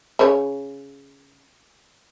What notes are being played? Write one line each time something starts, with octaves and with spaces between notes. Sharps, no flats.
C#3 C#5